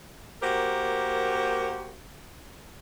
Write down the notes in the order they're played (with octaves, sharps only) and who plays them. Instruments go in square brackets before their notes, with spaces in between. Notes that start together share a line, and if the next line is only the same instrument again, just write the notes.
[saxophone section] A#3 F#4 G4 A#4 C5